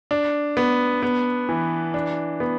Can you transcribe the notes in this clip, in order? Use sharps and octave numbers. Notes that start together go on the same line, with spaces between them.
D4
B3
B3
E3
D4
B3